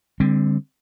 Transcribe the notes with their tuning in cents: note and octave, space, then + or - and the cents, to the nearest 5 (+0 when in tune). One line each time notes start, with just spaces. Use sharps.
D3 +0 G3 +40 C4 +0